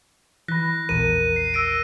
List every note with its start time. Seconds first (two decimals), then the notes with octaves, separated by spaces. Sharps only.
0.48 E3 B5 F#6 A#6
0.89 A#1 E2 A#4 D#7
1.36 C7
1.54 E6 A#6 D7